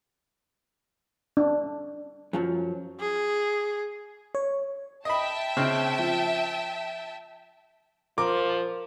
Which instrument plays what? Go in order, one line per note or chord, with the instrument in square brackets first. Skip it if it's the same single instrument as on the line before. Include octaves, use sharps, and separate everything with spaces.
[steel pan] D4
[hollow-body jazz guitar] F#2 F3 F#3
[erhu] G#4
[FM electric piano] C#5
[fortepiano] D#5 B5 [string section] E5 G5 A5
[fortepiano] C#3 C4 F6
F3
[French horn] F3 [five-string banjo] A#4 [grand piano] D6